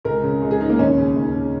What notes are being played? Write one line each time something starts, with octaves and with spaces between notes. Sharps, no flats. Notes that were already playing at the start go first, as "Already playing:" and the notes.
C#2 A#4
C#3
C#2
G#4
C#3 D#4
A#3
D#2 C#4
C#3
D#2
C#3